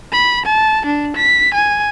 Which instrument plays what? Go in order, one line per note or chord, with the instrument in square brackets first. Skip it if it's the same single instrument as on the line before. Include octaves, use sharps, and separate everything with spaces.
[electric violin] B5
A5
D4
B6
G#5